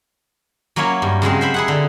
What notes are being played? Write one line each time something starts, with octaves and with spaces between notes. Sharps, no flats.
F#3 A#3 C#4 E4 C#5
G2
C#3 F#3 G#3 C4
C5 E5 B5
E4 G#4 F#5
D3